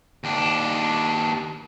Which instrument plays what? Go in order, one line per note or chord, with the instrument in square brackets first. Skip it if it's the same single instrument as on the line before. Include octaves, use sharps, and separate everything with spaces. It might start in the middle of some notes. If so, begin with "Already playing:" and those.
[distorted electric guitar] D#2 D4